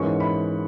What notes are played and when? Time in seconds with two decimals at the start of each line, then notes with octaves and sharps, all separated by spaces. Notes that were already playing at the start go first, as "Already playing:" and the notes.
Already playing: G#2 E3 A#3 C#4 C#6
0.20 B5